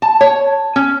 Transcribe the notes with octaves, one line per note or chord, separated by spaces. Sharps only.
A5
C#5
C#4